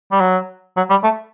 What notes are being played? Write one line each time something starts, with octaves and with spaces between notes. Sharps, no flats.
G3
F#3
F#3
G3
A3